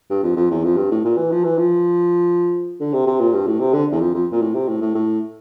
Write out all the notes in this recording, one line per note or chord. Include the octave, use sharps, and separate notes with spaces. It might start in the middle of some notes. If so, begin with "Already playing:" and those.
G2
F2
F2
E2
F2
G2
A2
A#2
E3
F3
E3
F3
D3
C3
C3
A#2
G2
A2
C3
D3
E2
F2
F2
A#2
A2
C3
A2
A2
A2